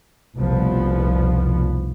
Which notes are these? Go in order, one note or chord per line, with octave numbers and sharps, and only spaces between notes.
F1 C2 B2 F3 B3